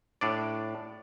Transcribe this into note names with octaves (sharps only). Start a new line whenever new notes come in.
A2 D4 D5